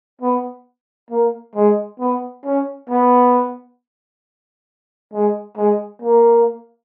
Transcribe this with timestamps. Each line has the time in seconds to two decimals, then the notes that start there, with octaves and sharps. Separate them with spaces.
0.22 B3
1.11 A#3
1.56 G#3
2.00 B3
2.45 C#4
2.90 B3
5.13 G#3
5.57 G#3
6.02 A#3